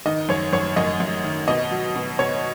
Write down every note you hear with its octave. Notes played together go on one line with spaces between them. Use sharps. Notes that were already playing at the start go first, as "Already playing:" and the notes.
D#3 D#5
F#2 C#5
F#2 C#5
F#2 D#5
F#2
D#3
B2 D#5
F#3
B2
B2 C#5